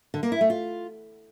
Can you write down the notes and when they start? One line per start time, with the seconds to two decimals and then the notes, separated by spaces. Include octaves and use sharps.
0.14 D3
0.23 A#3
0.32 E4
0.41 A3
0.50 F4